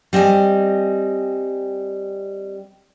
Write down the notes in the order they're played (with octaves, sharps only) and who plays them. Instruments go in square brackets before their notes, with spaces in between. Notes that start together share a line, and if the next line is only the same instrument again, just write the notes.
[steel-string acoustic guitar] G3 C4 D#5 G#5